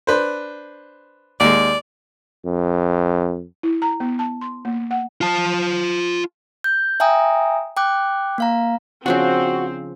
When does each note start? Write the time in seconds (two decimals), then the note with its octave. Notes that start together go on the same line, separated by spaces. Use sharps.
0.07 D4 B4 C5
1.40 D#2 G#3 D5
2.45 F2
3.63 E4
3.82 A#5
4.00 B3
4.19 A5
4.41 C6
4.65 A#3
4.91 F#5
5.21 F4 A5
6.64 G6
7.00 E5 G5 G#5 A#5 D#6
7.77 G5 D6 F#6
8.38 A#3 F5 A#5
9.06 C#3 F3 C4 D4 F#4